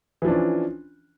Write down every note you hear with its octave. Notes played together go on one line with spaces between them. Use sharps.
E3 F3 C#4 D4